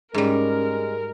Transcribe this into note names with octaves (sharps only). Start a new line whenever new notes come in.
G#2 G3 G#3 C#4 A#4